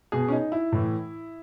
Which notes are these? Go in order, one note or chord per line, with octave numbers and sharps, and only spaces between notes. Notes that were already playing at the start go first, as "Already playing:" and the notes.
B2 G#4
C#4
D#4
E4
A2 E3